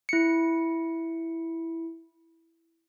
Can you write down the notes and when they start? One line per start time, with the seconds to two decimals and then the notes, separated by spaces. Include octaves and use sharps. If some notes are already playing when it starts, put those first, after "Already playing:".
0.09 E4 C#7